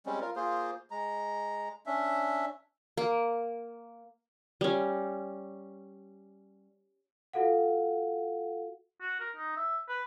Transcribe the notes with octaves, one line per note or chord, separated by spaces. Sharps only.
G3 G#3 C4 C#4
F4 A#4
A#3 F4 G#4 C5
G#3 A#5
C#4 D4 E5
A#3
G3 C#4
F4 F#4 A4 F5 F#5
F#4
A#4
D#4
E5
B4